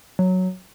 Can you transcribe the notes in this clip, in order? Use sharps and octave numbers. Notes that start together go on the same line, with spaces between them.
F#3